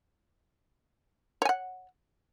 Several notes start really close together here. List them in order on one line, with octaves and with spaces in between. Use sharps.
C#5 G#5 F#5